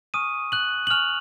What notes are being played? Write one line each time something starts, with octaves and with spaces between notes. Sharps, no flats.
G#5 C#6 D#6 F6 D#7
F#6 F#7
F#7
G#5 C#6 F6 F7